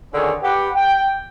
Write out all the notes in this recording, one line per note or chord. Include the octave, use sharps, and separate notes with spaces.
D3 D#3 C#4 F#4 G#4 C#5
G4 B4 F#5
G5